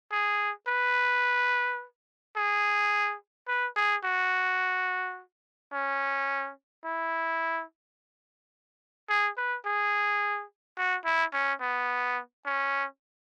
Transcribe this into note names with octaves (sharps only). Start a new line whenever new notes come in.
G#4
B4
G#4
B4
G#4
F#4
C#4
E4
G#4
B4
G#4
F#4
E4
C#4
B3
C#4